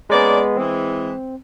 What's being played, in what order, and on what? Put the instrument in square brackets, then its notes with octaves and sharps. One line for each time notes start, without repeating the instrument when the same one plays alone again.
[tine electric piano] G#3 B3 [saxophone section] A#3 C#4 D5
[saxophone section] E3 G#3 [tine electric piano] C4